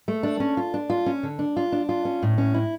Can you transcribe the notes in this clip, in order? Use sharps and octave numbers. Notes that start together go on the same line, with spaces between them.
A3
D4
C#4
F4
D4
F4
C#4
D3
D4
F4
D4
F4
C#4
A2
C#4
E4